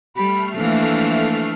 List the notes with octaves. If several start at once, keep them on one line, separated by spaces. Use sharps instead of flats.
G3 A3 B5 F6 C7
E3 F3 A#3 D4